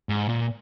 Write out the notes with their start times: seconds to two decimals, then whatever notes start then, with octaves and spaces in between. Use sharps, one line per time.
0.09 G#2
0.29 A#2